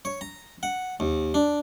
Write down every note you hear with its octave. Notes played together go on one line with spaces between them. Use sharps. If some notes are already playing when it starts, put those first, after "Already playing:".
C#5
A#5
F#5
D#2
D4